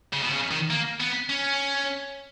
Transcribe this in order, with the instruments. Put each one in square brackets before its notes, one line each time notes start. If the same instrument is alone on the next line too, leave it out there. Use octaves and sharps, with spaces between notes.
[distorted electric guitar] C#3
B2
C#3
D#3
A#3
B3
C#4